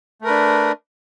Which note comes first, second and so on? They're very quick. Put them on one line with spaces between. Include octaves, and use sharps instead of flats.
A3 A#4 B4 D4